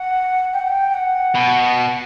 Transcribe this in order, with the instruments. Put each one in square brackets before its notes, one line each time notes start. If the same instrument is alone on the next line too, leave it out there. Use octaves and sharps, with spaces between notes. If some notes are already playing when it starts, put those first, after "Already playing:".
Already playing: [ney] F#5
G5
F#5
G5
F#5
[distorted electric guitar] B2